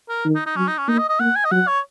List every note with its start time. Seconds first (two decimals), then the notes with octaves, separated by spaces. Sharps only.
0.09 A#4
0.25 D#3
0.35 D#4
0.46 D#4
0.56 F#3 C#4
0.67 D#4
0.78 C#4
0.88 A#3 D#4
0.98 D#5
1.09 D#5
1.20 A#3 F#5
1.36 G#5
1.45 D#5
1.51 F#3 F#5
1.67 C#5